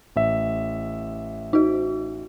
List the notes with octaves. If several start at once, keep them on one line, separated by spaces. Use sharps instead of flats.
A1 E5
D#4 F#4